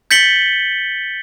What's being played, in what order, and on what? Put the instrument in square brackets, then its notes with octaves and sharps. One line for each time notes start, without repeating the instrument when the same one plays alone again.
[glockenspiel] G6 A6 B6 C#7 F#7 G7